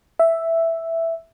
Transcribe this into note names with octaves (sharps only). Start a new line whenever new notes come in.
E5